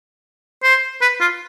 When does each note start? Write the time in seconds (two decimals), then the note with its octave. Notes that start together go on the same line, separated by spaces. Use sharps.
0.64 C5
1.02 B4
1.21 F4